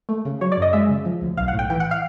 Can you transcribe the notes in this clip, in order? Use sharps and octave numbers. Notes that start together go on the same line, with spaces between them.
A3
C#3
F#3 C#5
D5
F#2 D#5
G#3 E5
C#3
F3
D2
B1 F5
F#5
A2
G5
E3 G5
F#5
F5